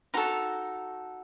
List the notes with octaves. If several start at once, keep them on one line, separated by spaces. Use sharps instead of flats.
D#4 F#4 A4 A#5